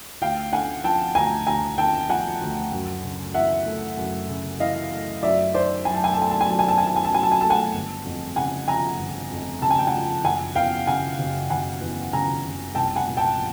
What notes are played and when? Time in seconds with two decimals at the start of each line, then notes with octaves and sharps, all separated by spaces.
0.21 D2 F5 G5
0.53 D3 F#5 G#5
0.84 F3 G5 A5
1.15 D2 G#5 A#5
1.47 D2 G#5 A#5
1.78 D3 G5 A5
2.09 F3 F#5 G#5
2.41 D2
2.72 F#2
3.04 C#3
3.34 E3 E5 F#5
3.66 A3
3.97 F#2
4.29 C#3
4.60 E3 D#5 F5
4.92 A3
5.23 F#2 D5 E5
5.54 D#3 C5 D5
5.85 F#3 G#5
5.94 A5
6.04 G#5
6.13 A3 A5
6.22 G#5
6.31 A5
6.41 G#5
6.48 F#2 A5
6.59 G#5
6.68 A5
6.78 D#3 G#5
6.87 A5
6.96 G#5
7.05 A5
7.11 F#3 G#5
7.23 A5
7.32 G#5
7.41 A3 A5
7.50 F#5 G#5
7.73 G1
8.05 F2
8.36 C#3 F#5 G#5
8.68 F3 G#5 A#5
8.99 G1
9.31 F2
9.62 C#3 A5
9.71 G#5
9.79 G5
9.87 F#5 G#5
9.93 F3
10.25 F#1 F#5 G#5
10.55 E2 F5 G5
10.87 C#3 F#5 G#5
11.19 F#1
11.50 F#1 F#5 G#5
11.81 E2
12.13 C#3 G#5 A#5
12.44 F#1
12.75 C2 G5 A5
12.96 F#5 G#5
13.06 A#2
13.17 G5 A5
13.38 F3